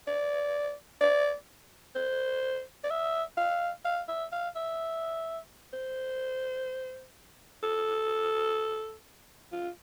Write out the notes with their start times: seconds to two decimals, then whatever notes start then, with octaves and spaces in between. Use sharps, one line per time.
0.07 D5
1.01 D5
1.95 C5
2.84 D5
2.90 E5
3.37 F5
3.85 F5
4.08 E5
4.32 F5
4.55 E5
5.73 C5
7.63 A4
9.52 F4